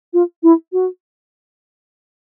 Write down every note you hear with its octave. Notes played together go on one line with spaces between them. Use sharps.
F4
E4
F#4